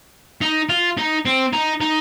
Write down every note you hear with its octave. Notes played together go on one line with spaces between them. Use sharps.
D#4
F4
D#4
C4
D#4
D#4